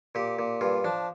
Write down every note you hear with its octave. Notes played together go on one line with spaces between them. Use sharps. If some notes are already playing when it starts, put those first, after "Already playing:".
A#2 G4
A#2
G2 F4
F3 D4